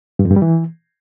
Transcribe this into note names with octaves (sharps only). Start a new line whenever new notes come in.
G2
F2
G2
G3
E3